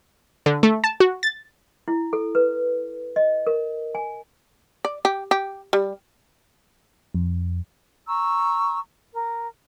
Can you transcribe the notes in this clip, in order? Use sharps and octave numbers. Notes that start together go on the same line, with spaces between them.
D3
A3
A5
F#4
A6
E4
A4
B4
D#5
A#4
G#5
D5
G4
G4
G3
F2
A#5 C#6 E6
A#4